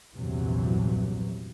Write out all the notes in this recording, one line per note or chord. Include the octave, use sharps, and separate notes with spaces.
A#1 E2 G2 C3 E3 F#3